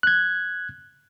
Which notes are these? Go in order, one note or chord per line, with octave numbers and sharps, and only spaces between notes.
F#6 G#6